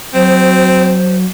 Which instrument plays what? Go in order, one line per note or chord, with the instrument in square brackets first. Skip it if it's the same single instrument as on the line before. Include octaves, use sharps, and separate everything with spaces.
[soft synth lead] F#3 [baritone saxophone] C4 [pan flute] C5